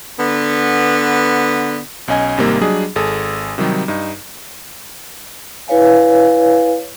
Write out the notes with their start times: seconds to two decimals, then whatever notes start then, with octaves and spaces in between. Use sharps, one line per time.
0.18 D3 B3
2.08 B1 C#4 D#5 G#5 G#6
2.38 G#1 C3 G3 A#3 D#4
2.61 F#3 G3 D4 G#4 D#5
2.96 G#1 G#4 A4 D#6
3.58 C3 D#3 F#3 G3 D#4
3.88 G2 D#4
5.68 E4 B4 C#5 F5 G#5